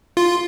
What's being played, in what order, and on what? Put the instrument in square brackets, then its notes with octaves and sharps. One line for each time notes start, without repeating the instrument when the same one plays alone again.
[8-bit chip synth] F4